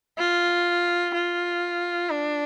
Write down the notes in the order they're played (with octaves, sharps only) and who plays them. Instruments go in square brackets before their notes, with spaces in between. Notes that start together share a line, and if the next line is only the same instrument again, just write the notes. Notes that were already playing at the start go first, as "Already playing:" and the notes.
[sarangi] F4
F4
D4